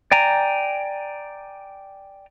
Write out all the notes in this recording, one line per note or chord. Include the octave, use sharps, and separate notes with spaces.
D5 G5 G#5 A#5